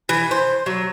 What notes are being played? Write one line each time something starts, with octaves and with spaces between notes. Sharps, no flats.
E3
C5
F#3